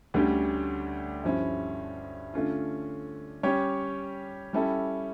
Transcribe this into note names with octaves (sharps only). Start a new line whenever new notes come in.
D2 D3 G3 C#4 G4
G2 F3 C#4 E4
D3 A3 C#4 F4
G3 C#4 G4 C#5
G3 C#4 E4 A4